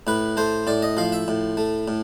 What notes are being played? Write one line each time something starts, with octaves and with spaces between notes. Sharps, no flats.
A2 B4
A3 C5
A2 D5
D#5
F3 F5
E5
A2
A3
A2